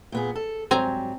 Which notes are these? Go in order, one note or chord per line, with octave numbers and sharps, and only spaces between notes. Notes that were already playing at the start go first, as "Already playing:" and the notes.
A#2 B3 G#4
A4
G#2 F#3 G3 C4 G#5 A#5